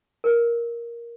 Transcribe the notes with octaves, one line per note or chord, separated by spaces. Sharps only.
A#4